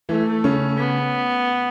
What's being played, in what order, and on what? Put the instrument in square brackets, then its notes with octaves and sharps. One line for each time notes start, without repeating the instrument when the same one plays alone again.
[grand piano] E3 E4 [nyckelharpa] A3
[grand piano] C#3 C#4
[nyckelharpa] B3